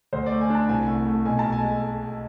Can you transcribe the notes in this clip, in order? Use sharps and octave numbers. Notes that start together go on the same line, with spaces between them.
D2 C5
D5
A3
G#5
D4 A5
C2 G#5
A3
A3
B1 G#5
B1 A5
G#5
G#3